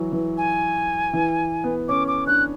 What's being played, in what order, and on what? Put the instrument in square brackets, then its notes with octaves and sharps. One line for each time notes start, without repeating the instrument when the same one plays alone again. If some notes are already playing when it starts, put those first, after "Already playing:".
Already playing: [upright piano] E3 F#3
E3
[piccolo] G#5
[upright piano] E3
B3
[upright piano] C#4 [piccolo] D6
[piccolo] D6
[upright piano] D4 [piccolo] F#6